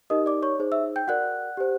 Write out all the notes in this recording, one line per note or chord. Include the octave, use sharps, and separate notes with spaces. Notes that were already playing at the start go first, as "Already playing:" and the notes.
D#4 G4 A#4 D#5 D#6
D5 D6
C#5 C#6
D#4 G#4 C5
E5 E6
G5 G6
F#4 A#4 D5 F#5 F#6
G4 C5